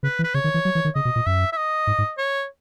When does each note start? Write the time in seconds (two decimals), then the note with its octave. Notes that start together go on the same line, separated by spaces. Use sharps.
0.03 C#3 B4
0.19 E3
0.24 B4
0.34 C#3 C#5
0.44 D#3
0.54 E3
0.65 F#3
0.75 E3
0.85 D#3
0.95 C#3 D#5
1.05 B2
1.16 A#2
1.26 F#2 E5
1.53 E5
1.57 D#5
1.87 G#2
1.98 G#2
2.18 C#5